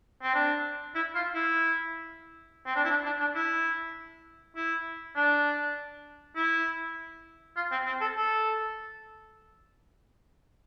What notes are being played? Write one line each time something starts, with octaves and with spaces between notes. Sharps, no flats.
C4
D4
E4
F4
E4
C4
D4
E4
D4
D4
D4
E4
E4
D4
E4
F4
C4
C4
A4
A4